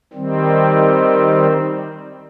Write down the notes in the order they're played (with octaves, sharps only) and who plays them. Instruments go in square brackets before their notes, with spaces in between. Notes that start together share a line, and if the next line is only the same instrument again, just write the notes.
[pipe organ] D#3 G3 C4